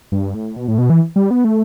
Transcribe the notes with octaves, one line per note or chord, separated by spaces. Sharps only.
G2
A2
B2
A2
B2
E3
G3
B3
A3